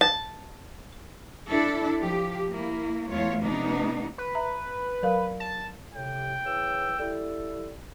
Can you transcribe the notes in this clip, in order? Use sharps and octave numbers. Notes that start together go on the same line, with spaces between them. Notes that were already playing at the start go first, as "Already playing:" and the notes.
A5
D4 E4 A4
F3 G4
A#3 E4
E2 A3 F4 C#5
C3 F3 A3 B3 D4 D#4
B4
E5 A#5
F#3 A#4 F5
A5
A2 C3 G5
C#3 E3 E6
G3 E4 A4